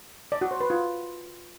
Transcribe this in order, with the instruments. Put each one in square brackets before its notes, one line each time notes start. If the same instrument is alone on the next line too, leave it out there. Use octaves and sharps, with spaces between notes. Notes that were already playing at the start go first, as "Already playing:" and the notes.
[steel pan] D5
F#4
C5
B4
F4